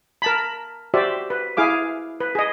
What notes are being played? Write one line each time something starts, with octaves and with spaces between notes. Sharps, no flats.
A#4 A5 B5
F#4 G4 C5 D5 E5
B4
E4 G#4 F5 D6
B4
G#4 D#5